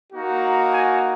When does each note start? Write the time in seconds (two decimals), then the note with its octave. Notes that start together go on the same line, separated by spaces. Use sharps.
0.12 A#3 D#4 F#4
0.73 G#5